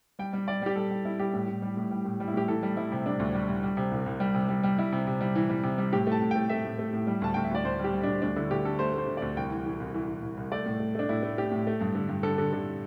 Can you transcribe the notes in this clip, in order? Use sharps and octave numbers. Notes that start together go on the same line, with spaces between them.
G3 G5
G3
G3 D5
G3 G4
G3 A4
G3
G3 E4
G3 G4
A2
A2
G3
A2
G3
A2
G3
E4
A2 G4
E3 A4
G3
G3 E4
C3
G3 D4
D2
G3
G3
G3
C3
C2
C2
G3
C3
G3
G3
G3 E4
C3
C3
G3
E3
G3
C3
G3
A2 G4
A3 A5
A2
A3 G5
A3 E5
A2
A3
A2
G3
D2 A5
D2 G5
E5
D2 D5
D2 C5
G3
G4
G3
D2 D4
D2 D4
D3 E4
D2 G4
D3 A4
A3 C5
A3 C5
D3
D2 D5
C2 G5
E3
E3
C2
E3
E3
C2
C2
A3 D5
A2
A3
A3 D4
A2 E4
A3
A3 G4
A2
A3
G2
D3
G2
D3 A4
D3
D3